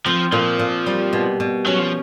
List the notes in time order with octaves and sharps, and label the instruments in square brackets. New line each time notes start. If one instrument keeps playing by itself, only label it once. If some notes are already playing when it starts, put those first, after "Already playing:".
[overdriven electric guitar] F3 [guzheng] C4
[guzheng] A#2 [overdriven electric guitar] F3
[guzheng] A#2
G3
B2
B2
[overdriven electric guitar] F#3 [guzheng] C#4
[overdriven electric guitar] F3